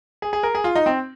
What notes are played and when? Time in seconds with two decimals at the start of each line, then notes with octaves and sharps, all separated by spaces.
0.22 G#4
0.33 G#4
0.43 A#4
0.55 G#4
0.64 F4
0.75 D#4
0.86 C4